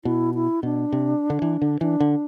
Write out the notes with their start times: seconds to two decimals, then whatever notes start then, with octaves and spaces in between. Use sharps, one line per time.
0.05 B2 E4
0.34 E4
0.63 B2 D4
0.92 C3
1.30 D3
1.42 E3
1.62 D3
1.81 E3 D4
2.00 D3